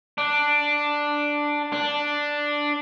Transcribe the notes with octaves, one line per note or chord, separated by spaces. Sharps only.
D4
D4